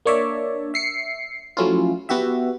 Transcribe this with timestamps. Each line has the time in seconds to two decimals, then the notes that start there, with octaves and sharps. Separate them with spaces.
0.06 A#3 D4 C#5 D5 E5
0.74 E5 C7 C#7
1.57 F3 F#3 A3 C#4 E4 F4
2.09 B3 F#4 G4 E5